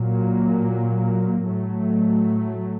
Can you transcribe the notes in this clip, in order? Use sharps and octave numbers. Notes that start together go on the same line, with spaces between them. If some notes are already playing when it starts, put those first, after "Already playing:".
Already playing: A#2 F#3 A#3
A2 F#3 A3